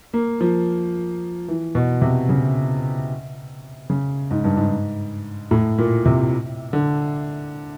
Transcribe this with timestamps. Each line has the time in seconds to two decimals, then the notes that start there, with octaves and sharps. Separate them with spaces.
0.14 A#3
0.41 F3
1.48 E3
1.75 B2
2.02 C3
2.29 C#3
3.90 C#3
4.31 G#2
4.44 G2
4.57 G#2
5.51 A2
5.78 A#2
6.05 C3
6.73 D3